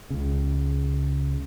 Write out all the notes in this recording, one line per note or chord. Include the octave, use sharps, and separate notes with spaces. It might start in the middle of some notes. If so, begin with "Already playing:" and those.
C#2 C#3